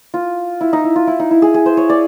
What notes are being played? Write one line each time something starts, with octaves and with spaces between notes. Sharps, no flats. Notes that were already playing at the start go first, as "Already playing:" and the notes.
F4
E4
D#4
E4
F4
E4
D#4
E4
G#4
G#4
C5
C#5
D5